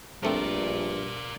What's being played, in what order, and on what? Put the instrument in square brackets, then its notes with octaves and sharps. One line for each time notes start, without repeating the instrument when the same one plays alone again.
[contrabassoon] A#1 [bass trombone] G2 [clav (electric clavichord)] F3 A3 C4 [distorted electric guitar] A#4 D5